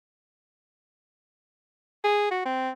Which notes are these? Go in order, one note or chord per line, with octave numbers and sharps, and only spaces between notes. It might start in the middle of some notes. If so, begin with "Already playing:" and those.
G#4
F#4
C4